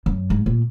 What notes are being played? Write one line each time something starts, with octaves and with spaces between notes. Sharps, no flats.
F#2
G#2
A#2